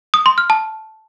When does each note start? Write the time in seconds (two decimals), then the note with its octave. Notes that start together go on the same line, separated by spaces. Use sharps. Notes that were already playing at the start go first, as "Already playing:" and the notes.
0.14 D#6
0.26 C6
0.38 F6
0.50 A5